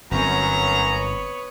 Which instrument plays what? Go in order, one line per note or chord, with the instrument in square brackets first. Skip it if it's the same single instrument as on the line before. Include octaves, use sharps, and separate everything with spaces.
[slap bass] G1 C4 [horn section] F#2 A#5 [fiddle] B3 C#5